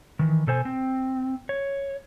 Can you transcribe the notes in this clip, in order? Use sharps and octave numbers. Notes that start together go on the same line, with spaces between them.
D#3 E3
B2 A4 C5 G#5
C4
C#5